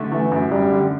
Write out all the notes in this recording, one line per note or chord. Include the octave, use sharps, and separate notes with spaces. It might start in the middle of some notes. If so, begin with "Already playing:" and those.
Already playing: D3 A3
E3 A3
F#2
F#2 G3
D3